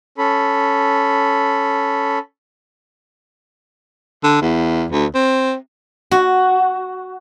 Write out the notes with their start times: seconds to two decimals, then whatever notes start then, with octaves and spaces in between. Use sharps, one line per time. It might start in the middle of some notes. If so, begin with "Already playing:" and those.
0.18 C#4 A4 B5
4.23 D3
4.41 E2
4.92 D2
5.14 C4
6.11 F#4